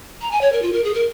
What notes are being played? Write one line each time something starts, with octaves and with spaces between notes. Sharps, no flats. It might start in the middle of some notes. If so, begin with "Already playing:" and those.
A#5
G#5
C#5
A#4
F4
A#4
G#4
A#4